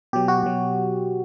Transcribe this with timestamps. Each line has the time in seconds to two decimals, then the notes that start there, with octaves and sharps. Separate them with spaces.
0.13 B2 F#3 G4
0.28 F#4
0.43 B2 F#3